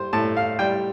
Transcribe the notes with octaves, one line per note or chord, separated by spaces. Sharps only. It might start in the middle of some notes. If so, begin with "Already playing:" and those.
Already playing: G3 C5
A2 A5
F5
G3 G5